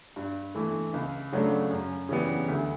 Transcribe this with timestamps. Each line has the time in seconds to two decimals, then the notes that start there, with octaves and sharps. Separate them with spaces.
0.16 G2
0.55 E3 A3 E4
0.94 C#2
1.32 C#3 F#3 A3 D4
1.71 F#2
2.09 C#3 E3 G3 B3
2.48 D2